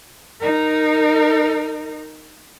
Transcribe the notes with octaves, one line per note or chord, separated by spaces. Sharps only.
D#4 A#4